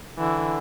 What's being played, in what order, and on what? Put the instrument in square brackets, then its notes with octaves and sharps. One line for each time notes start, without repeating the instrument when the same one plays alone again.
[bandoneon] D3 [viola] E3